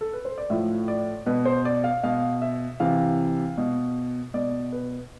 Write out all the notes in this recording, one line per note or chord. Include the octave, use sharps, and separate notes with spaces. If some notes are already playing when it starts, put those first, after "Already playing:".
A4
B4
C5
D5
A2 F3 E5
D5
B2 B4
C5
D5
F5
B2 F5
E5
C3 E3 F5
B2
B2 D5
B4